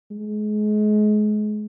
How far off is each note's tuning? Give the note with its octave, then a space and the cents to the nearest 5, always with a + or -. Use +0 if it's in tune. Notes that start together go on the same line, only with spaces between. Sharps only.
G#3 +30